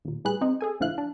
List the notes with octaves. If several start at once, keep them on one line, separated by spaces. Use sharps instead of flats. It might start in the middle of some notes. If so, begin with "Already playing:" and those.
D#2 A#2
A2 G3 G#4 B4 F#6
C4 D#4
G#4 A4 G#5
A#1 D3 F3 E4 F5 F#6
D4